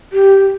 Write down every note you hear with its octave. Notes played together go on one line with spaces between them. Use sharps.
G4